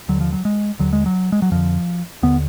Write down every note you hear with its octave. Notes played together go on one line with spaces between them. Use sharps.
D#2 D3 F#3
F3
F#3
G#3
D#2 D3 F#3
G#3
F#3
G#3
F#3
F2 D3 F3
D#2 D3 B3